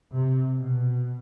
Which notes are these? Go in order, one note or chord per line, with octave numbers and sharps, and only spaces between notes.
C3
B2